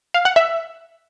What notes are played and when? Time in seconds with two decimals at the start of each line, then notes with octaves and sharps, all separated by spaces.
0.14 F5
0.25 F#5
0.36 E5